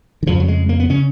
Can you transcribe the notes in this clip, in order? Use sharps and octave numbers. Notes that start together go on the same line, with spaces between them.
D#3
F2 C#3 F3
F#3
G#3
A#3
B3
C#3 C#4